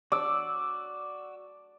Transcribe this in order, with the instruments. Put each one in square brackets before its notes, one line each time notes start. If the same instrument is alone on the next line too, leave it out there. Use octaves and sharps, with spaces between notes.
[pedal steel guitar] F#4 E6 [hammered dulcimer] D5